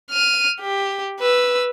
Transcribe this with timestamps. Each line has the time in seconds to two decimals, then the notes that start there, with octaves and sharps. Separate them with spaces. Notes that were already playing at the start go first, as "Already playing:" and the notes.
0.11 F6 D#7
0.61 G4
1.20 B4 E6